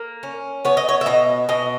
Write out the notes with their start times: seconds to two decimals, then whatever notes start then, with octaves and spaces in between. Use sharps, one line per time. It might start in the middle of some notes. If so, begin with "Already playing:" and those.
Already playing: A#3
0.23 C#4
0.65 B3 C#5
0.77 D#5
0.89 C#5
1.01 E5
1.06 B2 D#5
1.49 B2 D#5